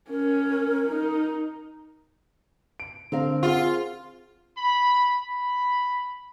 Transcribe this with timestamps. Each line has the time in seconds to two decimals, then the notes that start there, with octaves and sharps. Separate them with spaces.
0.10 C#4 A#4
0.89 D#4
2.80 D7
3.12 D3 C4 A#4 F5
3.43 F4 G#4 F#5
4.58 B5
5.23 B5